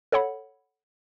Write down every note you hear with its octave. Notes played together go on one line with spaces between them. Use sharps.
A4 C#5 F#5 B5